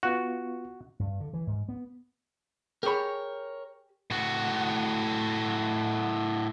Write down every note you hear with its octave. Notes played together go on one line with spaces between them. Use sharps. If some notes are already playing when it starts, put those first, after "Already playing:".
B3 F4 F#4 C#6
G2
D3
E3
G#2
B3
G4 G#4 A#4 C#5 B5
A2 F#4